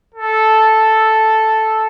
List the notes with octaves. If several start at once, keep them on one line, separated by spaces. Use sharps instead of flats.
A4